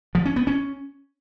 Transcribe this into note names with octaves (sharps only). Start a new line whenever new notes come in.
F3
C#4
B3
C#4